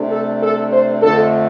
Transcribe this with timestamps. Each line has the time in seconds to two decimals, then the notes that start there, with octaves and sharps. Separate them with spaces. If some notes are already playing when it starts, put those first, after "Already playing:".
Already playing: C3 A3 D4
0.11 A4
0.41 A4
0.73 C5
1.02 F2 D3 A3 A4